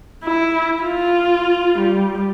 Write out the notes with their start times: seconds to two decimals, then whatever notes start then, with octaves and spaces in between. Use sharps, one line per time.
0.24 E4
0.82 F4
1.79 G3